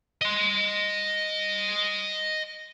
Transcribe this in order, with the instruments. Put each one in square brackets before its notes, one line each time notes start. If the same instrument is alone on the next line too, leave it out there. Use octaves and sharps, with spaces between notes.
[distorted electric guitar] D#5 C6